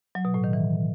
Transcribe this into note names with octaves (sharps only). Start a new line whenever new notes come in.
F#3
B2
A2
D#3
E3